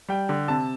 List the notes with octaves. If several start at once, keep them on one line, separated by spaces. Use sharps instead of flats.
G3 G5
D3
C3 A5